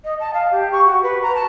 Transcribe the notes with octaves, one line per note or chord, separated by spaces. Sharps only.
D#5
A5
F5
G4
C#6
F#4
B4
A#5
A5